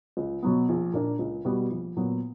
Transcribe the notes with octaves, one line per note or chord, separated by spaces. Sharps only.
C#2
B2 F#3 B3
A#1
A#2 A#3 D4
C#2
B2 G3 B3 F#4
A#1
A#2 F#3 B3